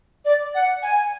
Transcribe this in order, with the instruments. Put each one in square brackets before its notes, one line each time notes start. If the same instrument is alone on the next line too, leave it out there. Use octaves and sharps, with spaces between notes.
[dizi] D5
F#5
G#5